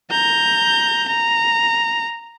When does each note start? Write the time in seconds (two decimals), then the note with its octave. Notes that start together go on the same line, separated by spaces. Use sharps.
0.11 A#5 G6
1.08 A#5